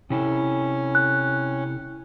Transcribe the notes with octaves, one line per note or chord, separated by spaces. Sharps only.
C3 C#4 E4 A4
F#6